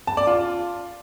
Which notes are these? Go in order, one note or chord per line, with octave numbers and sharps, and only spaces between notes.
A5
D5
F4